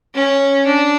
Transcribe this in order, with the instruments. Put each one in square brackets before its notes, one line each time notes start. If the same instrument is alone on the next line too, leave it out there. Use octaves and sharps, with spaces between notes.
[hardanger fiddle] C#4
D4